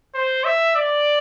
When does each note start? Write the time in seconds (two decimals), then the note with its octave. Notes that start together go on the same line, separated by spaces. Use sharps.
0.15 C5
0.44 E5
0.76 D5